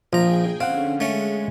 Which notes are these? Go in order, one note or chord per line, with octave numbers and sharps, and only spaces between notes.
A#1 F3 G#4 G5 G#5 A#5
D3 C4 C#4 F5 F#5
G#3 A3 C#4